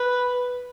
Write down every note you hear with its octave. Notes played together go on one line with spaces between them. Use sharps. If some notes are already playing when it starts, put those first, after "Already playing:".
Already playing: B4